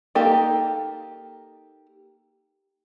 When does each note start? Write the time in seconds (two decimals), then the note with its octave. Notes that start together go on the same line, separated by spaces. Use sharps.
0.15 A#3 D#4 G4 A4